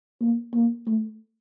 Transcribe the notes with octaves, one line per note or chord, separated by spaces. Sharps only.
A#3
A#3
A3